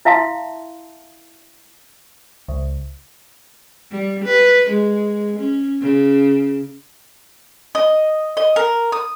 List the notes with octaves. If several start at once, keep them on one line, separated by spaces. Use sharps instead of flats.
E4 E5 F5 A5 C6
C#2
G3
B4
G#3
C#4
C#3
D#5
D#5
A#4
D#6